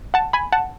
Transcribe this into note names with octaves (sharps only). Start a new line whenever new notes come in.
F#5 A5
G#5 B5
F#5 A5